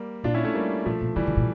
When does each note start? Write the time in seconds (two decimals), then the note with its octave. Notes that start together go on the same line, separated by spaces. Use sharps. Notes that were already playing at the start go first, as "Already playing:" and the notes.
Already playing: G3 A#3
0.24 A#2 D4 F4
0.34 C#4 E4
0.45 A3 C#4
0.54 G3 A#3
0.86 A#2 F3 A3
1.01 A#2
1.16 C#3 E3 G3
1.27 D3
1.37 A#2